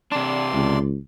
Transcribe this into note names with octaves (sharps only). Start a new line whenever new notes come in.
C3 D4 D5 C6
C#2